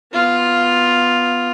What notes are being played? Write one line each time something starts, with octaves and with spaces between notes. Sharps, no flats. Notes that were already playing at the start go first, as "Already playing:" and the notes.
B3 F4